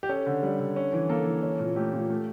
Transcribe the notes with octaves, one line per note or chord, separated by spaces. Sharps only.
G4
C#4 A4
D3
G3
D3
C#4
E3
A#3 A4
E3
C#4
A#2
A3 G4
A#2
A3